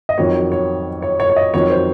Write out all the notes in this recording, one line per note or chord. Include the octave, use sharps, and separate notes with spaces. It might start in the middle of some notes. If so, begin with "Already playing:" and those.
D#5
F2 D#3 F#3 C#5
C#5
C#5
C#5
C#5
D#5
F2 D#3 F#3 C#5
C5